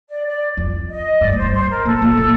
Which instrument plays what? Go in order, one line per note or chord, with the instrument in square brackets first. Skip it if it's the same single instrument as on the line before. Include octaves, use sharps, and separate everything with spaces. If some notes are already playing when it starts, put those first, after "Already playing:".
[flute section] D5
D5
[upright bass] F2
[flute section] D#5
[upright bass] G2 [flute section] D5
[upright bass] A2
[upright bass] G2 [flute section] C5
[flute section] C5
A#4
[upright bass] A#2 [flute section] A4
[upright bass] A#2
A#2